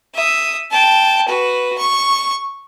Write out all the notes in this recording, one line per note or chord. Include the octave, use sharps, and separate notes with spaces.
E5 D#6
G5 A5
F#4 B4
C#6